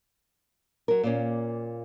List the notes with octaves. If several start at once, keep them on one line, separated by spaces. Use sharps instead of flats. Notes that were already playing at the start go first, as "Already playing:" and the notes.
F#3 A#4
A#2 A#3 C#4